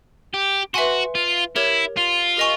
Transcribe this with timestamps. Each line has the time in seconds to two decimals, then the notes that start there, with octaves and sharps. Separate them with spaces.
0.34 G4
0.74 F#4 B4 E5 G#5 C6
1.15 F4
1.56 E4 G4 A#4 C#5
1.97 F4
2.37 G4 A#4 D#5 G#5 C#6